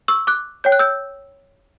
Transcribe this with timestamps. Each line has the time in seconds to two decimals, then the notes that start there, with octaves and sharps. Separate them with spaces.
0.08 C#6 E6
0.27 D6 F#6
0.64 C#5 G5 G6
0.72 F#6
0.79 E6 G6